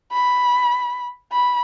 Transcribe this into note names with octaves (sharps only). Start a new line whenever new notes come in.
B5
B5